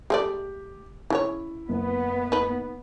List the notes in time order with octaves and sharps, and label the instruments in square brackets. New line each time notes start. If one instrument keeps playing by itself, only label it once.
[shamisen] G#3 A3 D5 [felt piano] G4
[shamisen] C#3 D4 C#5 [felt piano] E4
[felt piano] F#1 [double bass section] B3
[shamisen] D#4 B4